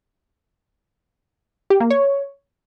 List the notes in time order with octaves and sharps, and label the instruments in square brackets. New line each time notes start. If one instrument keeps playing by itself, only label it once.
[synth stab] G4
A#3
C#5